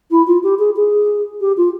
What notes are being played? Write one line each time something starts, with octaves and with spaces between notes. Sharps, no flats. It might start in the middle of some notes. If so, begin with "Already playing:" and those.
E4
F4
G4
G#4
G#4
G4
F4